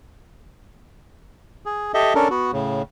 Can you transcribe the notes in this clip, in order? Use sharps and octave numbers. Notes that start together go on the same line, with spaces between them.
G#4
G4 A4 D#5 E5
C#4 D4 A4 A#4
B3 F#4
A2 C#3